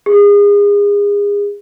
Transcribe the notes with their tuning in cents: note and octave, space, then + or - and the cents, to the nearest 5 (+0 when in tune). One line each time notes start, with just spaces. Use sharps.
G#4 -30